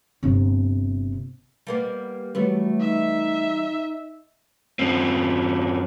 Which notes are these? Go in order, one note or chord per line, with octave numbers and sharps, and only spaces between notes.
G1 C3
G3 A#3 B3
E3 F#3 G3 A3 B3
D#4 E5
F#2 C4